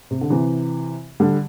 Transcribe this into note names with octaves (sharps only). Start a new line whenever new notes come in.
C3
D3
C3 E3
D3 G3